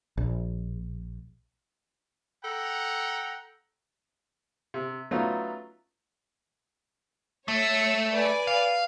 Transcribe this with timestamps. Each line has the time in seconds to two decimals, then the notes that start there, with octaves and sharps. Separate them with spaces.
0.17 A#1
2.45 A4 F#5 G5 A#5
4.74 C3
5.11 F#3 A3 B3 C#4 D#4 F4
7.48 A3 C#5 E6
8.13 B4 D5 G#5
8.47 F5